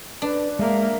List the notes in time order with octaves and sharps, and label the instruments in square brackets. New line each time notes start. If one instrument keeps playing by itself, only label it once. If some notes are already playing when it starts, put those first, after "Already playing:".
[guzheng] D4 [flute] B4
[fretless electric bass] G#3 [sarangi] A#3 [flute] E5